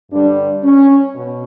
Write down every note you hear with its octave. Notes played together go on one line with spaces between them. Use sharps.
G2 D3 G3 D4
C#4
B2